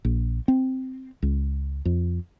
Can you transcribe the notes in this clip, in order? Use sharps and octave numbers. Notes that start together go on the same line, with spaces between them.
A#1
C4
C#2
F2